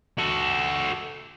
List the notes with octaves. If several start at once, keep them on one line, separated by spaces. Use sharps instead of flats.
F#4 A4